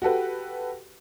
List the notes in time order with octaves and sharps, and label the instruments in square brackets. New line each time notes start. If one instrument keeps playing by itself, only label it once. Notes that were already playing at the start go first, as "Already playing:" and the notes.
[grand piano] F#4 G4 A4 B4